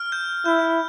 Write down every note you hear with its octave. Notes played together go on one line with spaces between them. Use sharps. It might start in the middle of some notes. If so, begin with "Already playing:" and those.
Already playing: F6
G6
E4 G6